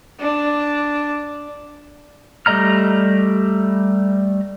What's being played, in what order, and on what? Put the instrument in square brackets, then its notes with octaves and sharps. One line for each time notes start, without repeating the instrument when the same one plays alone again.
[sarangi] D4
[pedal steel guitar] G3 A3 D#5 A#5 F6